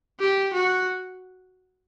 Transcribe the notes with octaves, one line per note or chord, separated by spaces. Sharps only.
G4
F#4